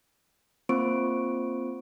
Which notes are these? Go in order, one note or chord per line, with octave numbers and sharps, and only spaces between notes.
A#3 C4 F4 C5 C#6 D7